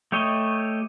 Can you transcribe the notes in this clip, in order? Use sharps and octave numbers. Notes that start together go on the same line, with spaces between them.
A3 G4 C#5 D#5